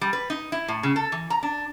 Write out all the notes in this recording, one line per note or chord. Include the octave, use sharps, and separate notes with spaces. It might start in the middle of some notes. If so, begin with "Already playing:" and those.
G3
B4
D#4
E4
A2
C#3
A4
E3
A#5
D4